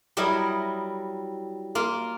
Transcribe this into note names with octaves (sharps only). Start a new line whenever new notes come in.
F#3 G3 E4 A#4 D#5
A#3 F4